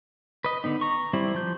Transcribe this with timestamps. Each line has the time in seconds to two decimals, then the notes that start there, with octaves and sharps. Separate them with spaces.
0.44 B4 D#5
0.64 D3 B3 D#4
0.81 A#5 C#6
1.13 G3 C4 E4
1.35 F3 G6